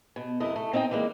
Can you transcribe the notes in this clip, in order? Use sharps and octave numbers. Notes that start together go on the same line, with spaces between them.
B2
F#2 C3 A3 E4 D#5
A3
C4 D#4 D#5 F#5 G5
E3 G3 G#3 A#3